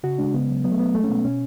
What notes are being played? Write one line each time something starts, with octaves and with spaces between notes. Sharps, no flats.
C#3 F#4
G#3 D4
C#3 B3
F#3
F#3 B3
A3
F#3 B3
G#3 A3
C#4
B2 B3
B2 C#4